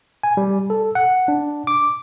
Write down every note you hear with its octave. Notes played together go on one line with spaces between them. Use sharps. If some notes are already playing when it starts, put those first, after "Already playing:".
G#5
G3
A4
F#5
D4
D6